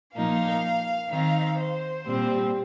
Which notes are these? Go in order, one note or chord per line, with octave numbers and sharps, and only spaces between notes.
A#2 F3 A#3 D#4 F5
D#3 C4 D#4 F5
C5
A#2 G3 C4